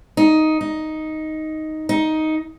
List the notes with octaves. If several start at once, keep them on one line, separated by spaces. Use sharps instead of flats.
D#4
D#4
D#4